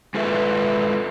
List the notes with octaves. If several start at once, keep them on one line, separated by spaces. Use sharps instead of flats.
G#3 F4 A4 B4 E5